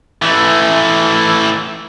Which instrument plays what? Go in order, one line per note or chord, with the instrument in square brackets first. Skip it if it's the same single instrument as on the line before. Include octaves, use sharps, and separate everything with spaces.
[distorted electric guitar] E3 A3